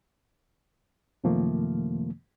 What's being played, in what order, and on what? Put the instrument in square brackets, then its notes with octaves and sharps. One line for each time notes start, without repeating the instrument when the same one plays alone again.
[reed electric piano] F#2 C3 D#3 F3 A3 A#3